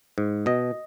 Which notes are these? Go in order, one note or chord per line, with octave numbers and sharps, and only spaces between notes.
G#2
B2 D#5